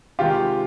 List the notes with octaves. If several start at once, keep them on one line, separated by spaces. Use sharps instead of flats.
C3 D#3 G#3 F4 G4